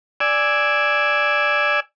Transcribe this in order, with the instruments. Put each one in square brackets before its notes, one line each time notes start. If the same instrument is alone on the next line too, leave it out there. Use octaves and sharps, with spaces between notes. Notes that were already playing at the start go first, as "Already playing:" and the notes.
[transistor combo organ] D5 G#5 E6